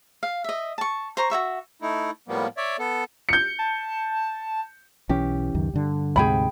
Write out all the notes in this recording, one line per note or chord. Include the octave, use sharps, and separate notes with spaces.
F5
D#5 E5
A5 C#6
C5 A#5 C#6
F#4 C#5 E5 C#6
A3 D#4 E4
A2 F3 G3 A#3 B3
C#5 D5 E5
B3 A4
G6 C#7
A5
B1 E3 C#4 G4
C#2 F#2 D#3
G2 D3
D2 G#2 C3 G#4 G5 B5